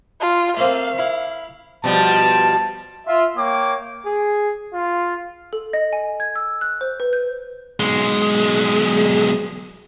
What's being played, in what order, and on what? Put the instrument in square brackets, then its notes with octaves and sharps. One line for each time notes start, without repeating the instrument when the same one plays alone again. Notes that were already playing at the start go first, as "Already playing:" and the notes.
[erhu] F4
[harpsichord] A3 A#3 C4 [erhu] F5
[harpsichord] E4
[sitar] B2 F3 G3 [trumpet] A5
[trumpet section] F4 E5
A#3 C#5 G5 D6
[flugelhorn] G#4
F4
[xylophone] A4
D#5
G#5
G#6
E6
F#6
C5
B4
G6
[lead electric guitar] B1 G#3